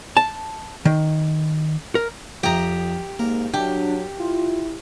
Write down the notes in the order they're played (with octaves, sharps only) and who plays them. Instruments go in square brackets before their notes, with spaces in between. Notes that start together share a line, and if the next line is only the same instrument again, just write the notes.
[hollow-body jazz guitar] A5
D#3
A#4
[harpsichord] F2 D#6 [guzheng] G4 A#5
[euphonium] G#2 [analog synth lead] A#3 [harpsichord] A#4
[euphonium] F#3 [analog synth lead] D4 [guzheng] G4
[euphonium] E4 [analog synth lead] F4